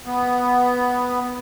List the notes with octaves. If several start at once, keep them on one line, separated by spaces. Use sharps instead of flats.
B3